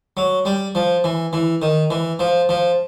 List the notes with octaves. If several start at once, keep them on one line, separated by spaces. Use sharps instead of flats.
F#3
G3
F3
E3
E3
D#3
E3
F3
F3